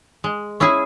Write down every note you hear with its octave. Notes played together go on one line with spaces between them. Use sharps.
G#3
C#4 E4 G#4